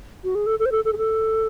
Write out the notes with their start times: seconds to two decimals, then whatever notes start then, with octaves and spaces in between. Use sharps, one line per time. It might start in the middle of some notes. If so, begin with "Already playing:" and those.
0.24 F#4
0.35 G#4
0.46 A4
0.59 A4
0.66 C5
0.72 A4
0.85 A4
0.93 G#4
0.98 A4